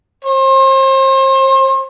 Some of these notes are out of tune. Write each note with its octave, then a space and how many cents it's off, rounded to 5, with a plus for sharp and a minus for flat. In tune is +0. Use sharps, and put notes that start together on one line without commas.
C5 +35